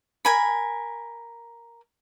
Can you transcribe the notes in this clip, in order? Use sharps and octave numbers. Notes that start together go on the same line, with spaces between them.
A#4 G#5 B5